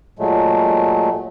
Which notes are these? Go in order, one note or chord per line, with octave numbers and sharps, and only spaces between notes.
A#2 F#3 G#3 A3